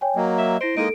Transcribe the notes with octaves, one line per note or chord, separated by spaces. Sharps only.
C#5 G5 G#5
F#3 A#3 D#5
E5
E4 C5 A#6 D7
G#3 A#3 D#4 A4 D#5 D7